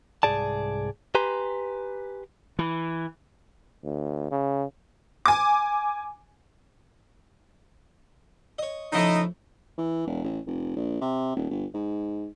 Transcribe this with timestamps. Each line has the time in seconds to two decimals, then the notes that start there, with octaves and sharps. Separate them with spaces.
0.23 C2 G#2 G#4 D5 A5
1.15 G4 B4 G#5 A#5 C6
2.59 E3
3.84 D2
4.31 C#3
5.26 G#5 D6
8.59 C#5 D#5
8.93 C#3 F3 A3 D#4 E4 D#5
9.78 E3
10.07 E1
10.24 A1
10.47 F1
10.76 A#1
11.01 C3
11.36 D#1
11.51 G1
11.74 G#2